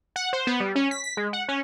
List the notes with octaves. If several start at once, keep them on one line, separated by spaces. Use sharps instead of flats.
F#5
C5
B3
G3
C#4
B6
B6
G#3
F#5
C#4